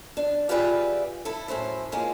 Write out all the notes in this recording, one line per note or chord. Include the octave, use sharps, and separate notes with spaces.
D4
F4 G4 G#4 B4 D5 E5
E4 A4
F#2 A2 C5 E5
F3 G#3 A#3 C#4